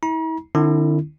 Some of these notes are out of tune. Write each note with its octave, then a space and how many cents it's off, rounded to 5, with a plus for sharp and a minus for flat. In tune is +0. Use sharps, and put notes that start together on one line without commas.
E4 -40 A#5 +45
D3 +45 C#4 -40 E4 +0